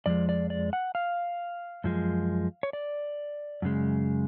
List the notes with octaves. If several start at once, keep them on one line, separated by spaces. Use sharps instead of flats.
F2 F3 G#3 D5
D5
D5
F#5
F5
F#2 F3 G#3
C#5
D5
F#2 C#3 G#3